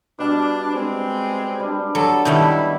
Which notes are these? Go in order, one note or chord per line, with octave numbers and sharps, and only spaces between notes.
B2 G3 D4
G#3 C4
G3 D4
F#3 A4
B2 D#3 G3 A3 B3 E4